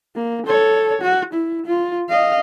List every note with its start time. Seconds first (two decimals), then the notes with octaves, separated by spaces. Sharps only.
0.16 A#3
0.47 A4 C#5
1.02 F#4
1.33 E4
1.66 F4
2.09 D#5 F5